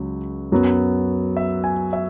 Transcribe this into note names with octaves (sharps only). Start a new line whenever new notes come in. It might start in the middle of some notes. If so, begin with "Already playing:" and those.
Already playing: C#2 C#3 F#3
F#2 F#3 B3
E5
G#5
E5